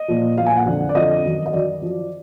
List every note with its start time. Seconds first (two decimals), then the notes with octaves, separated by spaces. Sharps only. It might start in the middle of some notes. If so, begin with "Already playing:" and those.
Already playing: D#5
0.08 A#2 F3
0.37 A#2 F3 F5
0.46 G#5
0.57 F#5
0.66 F2 D3 F3
0.89 D5
0.95 F2 D3 F3 D#5
1.24 F#2 D#3
1.46 D#5
1.53 F#2 D#3 D5
1.81 F#2 F3